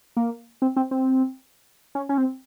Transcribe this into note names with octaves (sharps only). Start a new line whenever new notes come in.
A#3
C4
C4
C4
C#4
C#4
C4